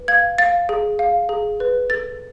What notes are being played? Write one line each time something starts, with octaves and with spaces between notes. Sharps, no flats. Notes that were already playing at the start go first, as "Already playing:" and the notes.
Already playing: B4
F5 G#6
F5 A6
G#4
F5
G#4
B4
A4 A6